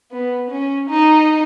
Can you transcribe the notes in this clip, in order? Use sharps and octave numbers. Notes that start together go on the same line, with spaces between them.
B3
C#4
D#4